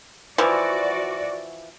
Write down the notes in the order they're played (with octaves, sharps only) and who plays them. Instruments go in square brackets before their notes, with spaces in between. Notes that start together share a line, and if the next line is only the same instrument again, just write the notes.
[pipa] E3 F3 [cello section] F#4 D5